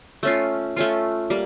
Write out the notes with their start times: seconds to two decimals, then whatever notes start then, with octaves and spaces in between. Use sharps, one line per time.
0.23 A3 C#4 F4
0.76 A3 C#4 F4
1.30 G3 A#3